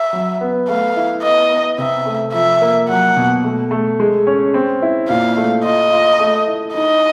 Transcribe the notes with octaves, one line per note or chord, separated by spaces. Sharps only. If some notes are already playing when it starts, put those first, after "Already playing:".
Already playing: E5
F#3
B3
A3 F5
E4
B3 D#5
B3
C3 E5
A3
F3 E5
A#3
F#3 F#5
B2
A3
A3
G#3
C#4
C4
E4
A#2 F5
A3
F4 D#5
F4
A3
E4
D#4 D#5